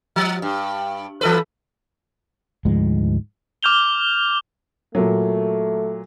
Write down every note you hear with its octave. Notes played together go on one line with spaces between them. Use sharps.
F3
G2
E3 A4 B4
D2 G#2 F3 G#3
D6 F6 G6 F7 G7
A#2 F#3 A3